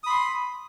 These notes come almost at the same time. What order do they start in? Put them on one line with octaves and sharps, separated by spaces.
D#6 B5 C6